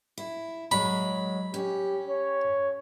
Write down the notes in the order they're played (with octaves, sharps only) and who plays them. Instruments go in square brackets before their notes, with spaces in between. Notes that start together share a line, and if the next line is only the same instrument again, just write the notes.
[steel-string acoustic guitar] E4
[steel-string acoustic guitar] F#3 G#3 [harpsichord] B5
[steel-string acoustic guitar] C#4 [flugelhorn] G4
[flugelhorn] C#5